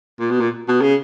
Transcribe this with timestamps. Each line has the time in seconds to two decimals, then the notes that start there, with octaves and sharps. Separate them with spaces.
0.20 A#2
0.30 B2
0.40 A#2
0.68 B2
0.82 C#3